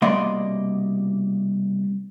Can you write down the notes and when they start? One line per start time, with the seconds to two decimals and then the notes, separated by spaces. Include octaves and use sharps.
0.02 C2 B2 A#3 D5 D#5 C6